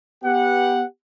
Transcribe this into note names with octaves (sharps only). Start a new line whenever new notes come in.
B3 G4 F#5